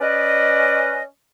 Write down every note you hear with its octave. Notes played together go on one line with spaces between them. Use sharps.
C#4 B4 D5 D#5